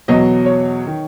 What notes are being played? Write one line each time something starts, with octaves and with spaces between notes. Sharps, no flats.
E2 B2 F#3 D#5
C#5
D#3